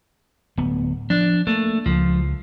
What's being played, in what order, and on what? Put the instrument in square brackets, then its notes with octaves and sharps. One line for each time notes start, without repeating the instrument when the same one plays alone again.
[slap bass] D1 B3
[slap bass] F3 [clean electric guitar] D4
[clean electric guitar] A3 [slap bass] A#3
[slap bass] C#2 [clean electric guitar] F3